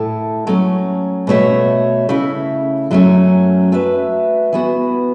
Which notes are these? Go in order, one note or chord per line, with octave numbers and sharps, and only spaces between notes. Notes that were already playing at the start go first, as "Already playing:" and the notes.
Already playing: A2 A3 E4 A4
F#3 A3 C#4
B2 A3 F#4 C#5 E5
C#3 A3 E4
F#2 F#3 A3 C#4
A3 F#4 B4 E5
E3 B3 F#4